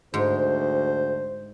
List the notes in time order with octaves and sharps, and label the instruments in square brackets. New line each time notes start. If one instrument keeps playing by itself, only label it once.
[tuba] D2 [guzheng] G#2 [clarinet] C5